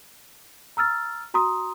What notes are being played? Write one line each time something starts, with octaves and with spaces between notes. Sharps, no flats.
A#5 E6 F6 A6
F#4 A#5 C6 D#6